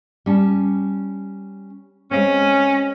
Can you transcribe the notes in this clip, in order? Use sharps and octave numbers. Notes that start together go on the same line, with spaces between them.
G3 C#4 A5
G#3 C4 C#4